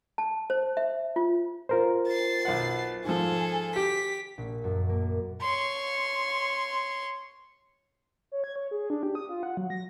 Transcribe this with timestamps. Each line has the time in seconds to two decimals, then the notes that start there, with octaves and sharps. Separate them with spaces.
0.18 A5
0.50 C5
0.77 E5
1.16 F4
1.69 F4 A#4 C5
2.07 A6 C7
2.45 B1 F#5
3.05 G#2 F3 G#4 A4
3.76 G4 B6
4.38 A#1
4.64 F#2
4.89 A#3
5.41 C#5 C6
8.32 C#5
8.44 G#6
8.56 C#5
8.71 G#4
8.90 D4
9.03 G4
9.15 D#6
9.29 F4
9.43 F#5
9.57 F#3
9.70 A#6